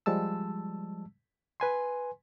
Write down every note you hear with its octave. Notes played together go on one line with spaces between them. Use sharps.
F3 G3 G#3 A5 E6
B4 G#5 C6